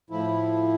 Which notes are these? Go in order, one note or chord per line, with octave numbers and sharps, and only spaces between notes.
A2 F3 E4